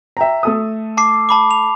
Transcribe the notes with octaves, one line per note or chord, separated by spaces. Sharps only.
E5 G5 A#5
A3 A4 D#6
A5 D6 C7
A5 B5 D6
F7